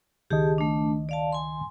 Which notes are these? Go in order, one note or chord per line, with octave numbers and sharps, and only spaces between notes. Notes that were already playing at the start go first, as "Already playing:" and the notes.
C#2 D#3 G4 G#4 D#5 A5
A3 D4
D5 F5 A5
G#5 C6